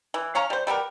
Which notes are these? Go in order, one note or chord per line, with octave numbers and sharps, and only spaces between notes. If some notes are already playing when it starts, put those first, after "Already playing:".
E3
C#4 C#5 F5 A#5
G3 C5
G3 B3 G4 A#4